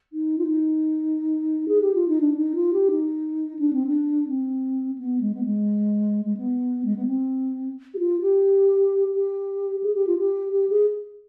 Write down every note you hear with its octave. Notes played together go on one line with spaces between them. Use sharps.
D#4
F4
D#4
G#4
G4
F4
D#4
D4
D#4
F4
G4
D#4
D4
C4
D4
C4
B3
G#3
B3
G#3
G#3
B3
G#3
B3
C4
G4
F4
G4
G4
G#4
G4
F4
G4
G4
G#4